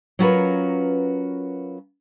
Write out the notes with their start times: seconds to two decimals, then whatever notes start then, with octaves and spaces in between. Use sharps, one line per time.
0.19 F#3 C#4 F4 F#4 A#4 B4